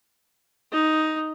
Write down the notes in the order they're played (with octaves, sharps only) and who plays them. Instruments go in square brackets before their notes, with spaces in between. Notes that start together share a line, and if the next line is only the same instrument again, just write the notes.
[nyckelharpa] D#4